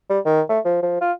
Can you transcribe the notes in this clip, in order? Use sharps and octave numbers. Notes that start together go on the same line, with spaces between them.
G3
D#3
A3
F3
F3
F4